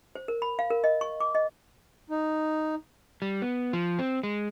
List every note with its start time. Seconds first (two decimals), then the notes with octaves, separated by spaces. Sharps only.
0.15 C5
0.28 A#4
0.42 B5
0.59 F5
0.70 A#4
0.84 D#5
1.01 C#6
1.20 D6
1.35 D#5
2.10 D#4
3.22 G3
3.42 B3
3.73 F3
3.99 C4
4.23 G#3